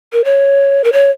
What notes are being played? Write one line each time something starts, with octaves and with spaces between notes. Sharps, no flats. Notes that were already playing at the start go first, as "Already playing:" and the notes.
A#4
C#5
A#4
C#5